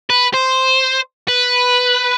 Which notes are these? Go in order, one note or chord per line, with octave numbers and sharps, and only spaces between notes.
B4
C5
B4